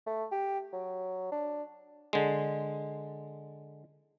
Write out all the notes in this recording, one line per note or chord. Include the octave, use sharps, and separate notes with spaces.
A3
G4
F#3
D4
D3 G#3